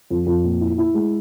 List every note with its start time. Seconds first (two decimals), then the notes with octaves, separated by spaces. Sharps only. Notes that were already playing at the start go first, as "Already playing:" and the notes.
0.10 F2
0.26 F2
0.44 A#2
0.61 E4
0.78 E4
0.94 G#3